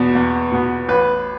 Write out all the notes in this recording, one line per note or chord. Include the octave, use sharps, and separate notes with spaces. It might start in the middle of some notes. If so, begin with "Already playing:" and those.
Already playing: E2 B2 B3
E2
B2 B3
A1 B4